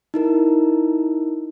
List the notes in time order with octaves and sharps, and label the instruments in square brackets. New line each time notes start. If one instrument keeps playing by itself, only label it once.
[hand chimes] D#4 E4 A#4